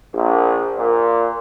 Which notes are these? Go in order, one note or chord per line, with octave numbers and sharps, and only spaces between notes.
A#1
A#2